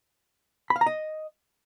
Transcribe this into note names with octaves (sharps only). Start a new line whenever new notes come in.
B5
F5
A#5
D#5